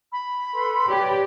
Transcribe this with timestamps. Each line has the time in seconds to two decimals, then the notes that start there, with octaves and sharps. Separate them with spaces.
0.12 B5
0.54 A4 B4 C6
0.88 G4 B4 C#5 D5